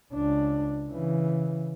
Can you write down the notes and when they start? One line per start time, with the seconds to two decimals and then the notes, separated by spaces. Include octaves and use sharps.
0.14 C#2 D4
0.90 C#3 E3